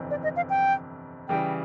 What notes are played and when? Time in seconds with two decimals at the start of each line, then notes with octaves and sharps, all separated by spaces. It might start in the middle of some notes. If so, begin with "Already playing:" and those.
Already playing: G1 F2 C3 E3
0.10 D5
0.23 D#5
0.36 F5
0.50 G5
1.29 C#3 E3 G3 G5